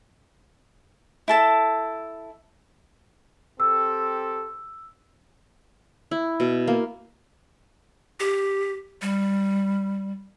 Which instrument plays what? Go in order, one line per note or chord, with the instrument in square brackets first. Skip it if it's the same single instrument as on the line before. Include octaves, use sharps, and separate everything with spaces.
[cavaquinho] E4 A4 A5
[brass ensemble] C4 G4 A4 [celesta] E6
[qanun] E4
B2
A#3
[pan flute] G4
G3